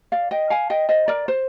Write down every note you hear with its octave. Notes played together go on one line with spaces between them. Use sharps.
D5 F5
D#5 G5
F5 G#5
D#5 G5
C5 D#5
A#4 D5
C5